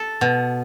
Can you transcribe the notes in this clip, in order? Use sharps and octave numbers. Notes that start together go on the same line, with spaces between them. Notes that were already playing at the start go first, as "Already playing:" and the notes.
Already playing: A4
B2